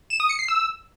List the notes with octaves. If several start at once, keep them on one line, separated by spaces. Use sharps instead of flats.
E7
D#6
C#7
C7
E6